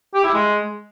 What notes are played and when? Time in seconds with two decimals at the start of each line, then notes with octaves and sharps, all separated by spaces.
0.14 G4
0.24 E4
0.34 G#3